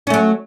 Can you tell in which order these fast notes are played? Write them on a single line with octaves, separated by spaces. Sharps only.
C#4 A3 F#3